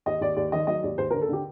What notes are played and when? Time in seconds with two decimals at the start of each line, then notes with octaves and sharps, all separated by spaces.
0.06 D#2 D#5
0.21 D#2 D5
0.36 D#2 D5
0.52 D#3 D#5
0.67 F#3 D#5
0.83 D#2 D5
0.98 D#2 C5
1.11 A#4
1.14 D3
1.22 A4
1.29 D3 G4